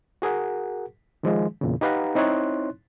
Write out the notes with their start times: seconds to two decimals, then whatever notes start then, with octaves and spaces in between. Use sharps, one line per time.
0.22 F#4 G#4 A#4 F#5
1.23 D#3 F3 G#3
1.61 E2 A#2 C#3
1.81 D#4 G4 B4 F5 F#5 A#5
2.15 C4 D#4 E4 C#5 C6 F#6